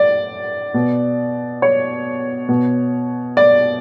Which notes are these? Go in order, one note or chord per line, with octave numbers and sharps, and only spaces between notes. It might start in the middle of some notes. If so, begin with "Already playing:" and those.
Already playing: D5
B2
C#5
B2
D5